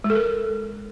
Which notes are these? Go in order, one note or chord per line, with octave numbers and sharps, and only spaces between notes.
G#3
A4
A#4